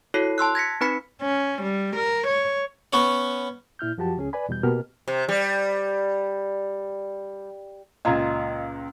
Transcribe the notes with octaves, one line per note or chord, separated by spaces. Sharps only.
E4 F#4 A4 C#5 C7
A5 C6 E6 F#6
G#6 A#6 B6 C#7
C4 D#4 B4 B5 B6 C#7
C#4
G3
A#4
C#5
B3 C#4 C#5
A#2 E4 F6 G6
F#2 F3 F#4 G4 A5
C#2 C#4 G#4
B4 D5 G#5 B5
E2 B2 G3 G6
B2 A#3 G4 A#4 F6
C3
G3
C#2 A#2 F4 D#5 A#5 G#6